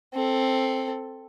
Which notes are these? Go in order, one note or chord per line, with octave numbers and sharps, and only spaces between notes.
C4 A4